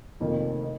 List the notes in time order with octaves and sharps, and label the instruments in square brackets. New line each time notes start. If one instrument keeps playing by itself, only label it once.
[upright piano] F1 F2 D#3 A#3
D#4